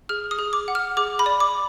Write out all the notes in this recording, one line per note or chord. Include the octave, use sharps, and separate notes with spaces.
G#4 F6
D#6
G#4
D6
F#5
F6
G#4 D6
B5
D5
D6